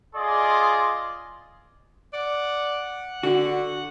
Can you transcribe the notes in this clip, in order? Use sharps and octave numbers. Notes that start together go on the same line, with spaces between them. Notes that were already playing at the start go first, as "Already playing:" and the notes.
F4 G#4 D5 D#5 C6 D6
D5 F#5
D3 F#4